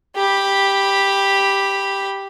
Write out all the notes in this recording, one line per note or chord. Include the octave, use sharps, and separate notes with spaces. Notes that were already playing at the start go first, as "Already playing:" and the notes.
G4 B5